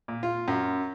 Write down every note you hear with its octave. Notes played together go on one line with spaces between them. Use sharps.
A#2
F4
F#2